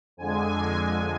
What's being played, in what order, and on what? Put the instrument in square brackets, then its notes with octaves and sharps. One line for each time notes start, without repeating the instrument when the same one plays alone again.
[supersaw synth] F2 D3 G#3 G#5